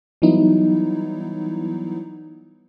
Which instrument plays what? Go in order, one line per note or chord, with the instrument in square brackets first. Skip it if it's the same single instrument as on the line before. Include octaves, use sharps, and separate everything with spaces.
[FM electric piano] E3 F#3 G3 B3 D#4 E4